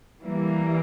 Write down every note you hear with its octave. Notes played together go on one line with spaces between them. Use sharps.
E3 G3 A#3